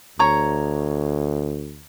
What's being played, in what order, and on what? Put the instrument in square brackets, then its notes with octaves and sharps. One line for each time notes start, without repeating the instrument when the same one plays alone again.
[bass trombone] D2 [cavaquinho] C#5 A#5 C#6